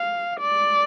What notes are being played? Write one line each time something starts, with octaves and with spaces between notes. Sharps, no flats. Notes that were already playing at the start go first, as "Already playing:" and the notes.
Already playing: F5
D5